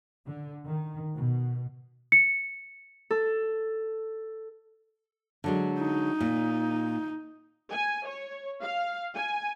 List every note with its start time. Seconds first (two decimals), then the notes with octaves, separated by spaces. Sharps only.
0.25 D3
0.65 D#3
1.16 B2
2.12 C#7
3.11 A4
5.44 D3 F#3 G#3
5.80 D#4
6.20 A#2
7.71 G#5
8.07 C#5
8.61 F5
9.15 G#5